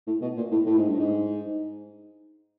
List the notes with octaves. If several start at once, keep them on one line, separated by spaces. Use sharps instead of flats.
A2
B2
A#2
A2
A2
G#2
G2
G#2